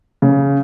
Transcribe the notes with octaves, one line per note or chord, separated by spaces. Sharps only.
C#3